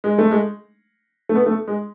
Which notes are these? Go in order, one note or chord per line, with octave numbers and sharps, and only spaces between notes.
G#3
A3
G#3
A3
B3
A3
G#3